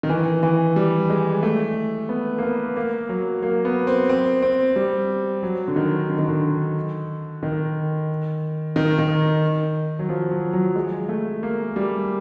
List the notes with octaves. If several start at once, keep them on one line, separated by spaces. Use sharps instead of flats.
D#3
E3
E3
G3
G#3
A3
B3
A#3
B3
A#3
F#3
A#3
B3
C4
C4
C4
G3
F#3
D3
D#3
D3
D#3
D3
D#3
D#3
D#3
F#3
F3
F#3
F#3
G#3
A3
A#3
G3